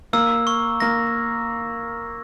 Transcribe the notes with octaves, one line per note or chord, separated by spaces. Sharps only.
A#3 E6
C#6
A#3 A#6